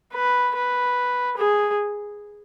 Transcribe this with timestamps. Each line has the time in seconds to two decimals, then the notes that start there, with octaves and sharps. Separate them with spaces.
0.14 B4
0.56 B4
1.37 G#4